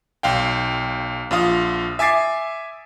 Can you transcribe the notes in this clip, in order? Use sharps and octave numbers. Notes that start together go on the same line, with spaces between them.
B1 F5 G5
A#1 F4 F5 D#6
E5 G#5 D6 A6 C7